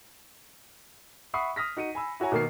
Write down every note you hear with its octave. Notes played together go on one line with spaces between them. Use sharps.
E5 F#5 B5 C#6 D#6 C7
D#6 F6 A#6 B6
D#4 F#4 C#7 D#7
G#5 B5 E6
E4 F#4 C#5 G#5 A#5
B2 D#3 A#3 A#4 C7